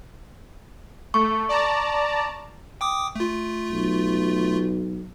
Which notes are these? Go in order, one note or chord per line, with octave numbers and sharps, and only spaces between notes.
A3 C#6
D5 A5 A#5
G5 D6 D#6
A3 F4
B1